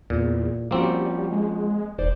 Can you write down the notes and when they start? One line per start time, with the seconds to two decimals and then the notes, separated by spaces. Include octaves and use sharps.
0.10 E2 A#2
0.71 F3 G3 A#3 C4 C#4 F#4
1.31 G#3
1.98 E1 D#4 C5 D5